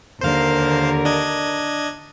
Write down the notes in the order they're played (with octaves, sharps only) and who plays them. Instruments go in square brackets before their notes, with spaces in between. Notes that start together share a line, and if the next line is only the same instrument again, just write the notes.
[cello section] D#2 D3 A#4 [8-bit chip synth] C5 F5
[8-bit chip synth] D4 D#5 G#6